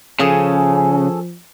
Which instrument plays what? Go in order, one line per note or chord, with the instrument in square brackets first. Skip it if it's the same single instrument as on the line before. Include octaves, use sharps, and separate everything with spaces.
[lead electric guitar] C#3 [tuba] F3 [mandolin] C#4 G#4 A4